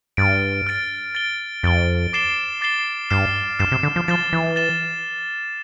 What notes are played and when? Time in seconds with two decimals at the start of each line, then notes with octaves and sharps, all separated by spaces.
0.17 G2 F6 A6 D7
0.67 F6 A6 D7
1.15 A6 D7 G7
1.63 F2 A6 D7 G7
2.13 D6 A6 C7 E7 G7
2.61 D6 A6 C7 E7 G7
3.10 G2 F6 C7 E7
3.59 G2 F6 C7 E7
3.72 C3
3.83 D3
3.96 F3
4.08 F3 A6 E7 G7
4.33 E3
4.56 A6 E7 G7